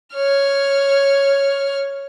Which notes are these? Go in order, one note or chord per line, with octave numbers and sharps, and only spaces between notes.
C#5 F6